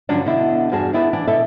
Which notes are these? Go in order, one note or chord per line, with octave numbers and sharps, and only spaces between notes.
G2 D3 F3 F#3 C#4 D4
B2 D3 E4
E2 G2 F#4 G#4 A5
B3 D4 E4 G#4 A4 B4
E3 D4
B2 E4 A4 E5